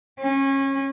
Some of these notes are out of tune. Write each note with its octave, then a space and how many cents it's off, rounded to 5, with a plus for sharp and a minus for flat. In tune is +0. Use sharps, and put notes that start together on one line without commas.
C#4 -25